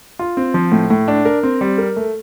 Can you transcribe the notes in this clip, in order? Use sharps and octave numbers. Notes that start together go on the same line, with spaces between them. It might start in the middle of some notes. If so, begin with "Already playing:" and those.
F4
C4
F3
A2
A2
D4
A#4
C4
G3
A#4
A3